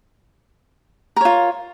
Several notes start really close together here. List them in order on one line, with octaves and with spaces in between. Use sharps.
A#4 C#5 F4